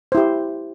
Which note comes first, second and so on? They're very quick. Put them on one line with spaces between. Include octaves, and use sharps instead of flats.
C5 E4 G4